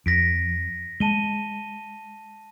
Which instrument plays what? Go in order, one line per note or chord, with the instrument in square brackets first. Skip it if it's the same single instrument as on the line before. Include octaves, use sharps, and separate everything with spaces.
[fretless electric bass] F2 [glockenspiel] A#6 B6 D7
[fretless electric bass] G#3 [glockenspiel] A5 D#7 G7